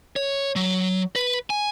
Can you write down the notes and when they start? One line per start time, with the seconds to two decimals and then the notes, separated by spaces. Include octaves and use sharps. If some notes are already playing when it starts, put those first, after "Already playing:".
0.16 C#5
0.56 F#3
1.16 B4
1.50 G#5